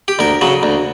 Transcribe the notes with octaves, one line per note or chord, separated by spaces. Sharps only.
G4
D2 A#4
C#3 F#3
D2